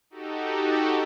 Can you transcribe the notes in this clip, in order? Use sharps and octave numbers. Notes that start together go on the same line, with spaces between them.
D#4 F#4 G4 A4